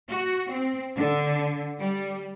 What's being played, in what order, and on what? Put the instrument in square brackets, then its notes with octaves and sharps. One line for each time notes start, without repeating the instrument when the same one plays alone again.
[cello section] F#4
C4
D3
G3